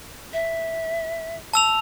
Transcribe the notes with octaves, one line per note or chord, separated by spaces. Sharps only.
E5
A5 E6 F7